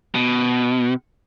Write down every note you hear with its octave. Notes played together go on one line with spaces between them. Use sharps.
B2